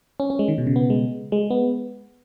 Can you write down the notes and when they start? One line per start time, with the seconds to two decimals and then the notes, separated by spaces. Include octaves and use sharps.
0.20 C#4
0.30 C#4
0.39 G#3
0.48 D#3
0.58 B2
0.67 C#3
0.76 B3
0.90 G#3
1.32 G#3
1.50 B3